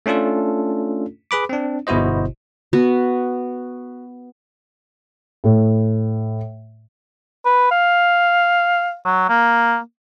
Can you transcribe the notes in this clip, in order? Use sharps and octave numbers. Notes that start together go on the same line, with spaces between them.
A3 C#4 D4 F4 A4
G#4 B4 B5 D6
C4 D4
G1 B2 E4 F#4 C5 D#5
B3 F#4 B4
A2
B4
F5
F#3
A#3